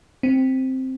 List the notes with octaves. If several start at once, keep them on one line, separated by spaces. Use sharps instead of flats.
C4